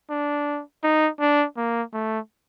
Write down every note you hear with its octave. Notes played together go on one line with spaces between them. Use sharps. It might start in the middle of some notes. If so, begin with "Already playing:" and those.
D4
D#4
D4
A#3
A3